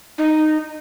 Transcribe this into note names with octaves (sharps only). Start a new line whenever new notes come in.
D#4